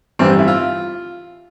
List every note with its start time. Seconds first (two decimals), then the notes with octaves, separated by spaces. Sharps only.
0.19 A1 G2 E3 C4
0.39 E4
0.48 F4